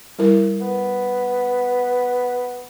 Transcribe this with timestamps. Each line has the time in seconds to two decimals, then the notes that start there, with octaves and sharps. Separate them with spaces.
0.19 G3 E4 A#4
0.61 B3